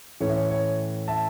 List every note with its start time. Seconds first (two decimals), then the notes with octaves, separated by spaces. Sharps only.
0.20 A2 E3 A3 C#4 C#5
0.29 E5
0.36 C#5
0.50 C#5
1.08 E5 A5